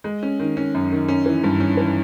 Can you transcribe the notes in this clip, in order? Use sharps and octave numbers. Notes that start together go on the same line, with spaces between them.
G#3
C#4
D#3
C#4
F#2
D#3
C#4
E3
G2
C#4
E3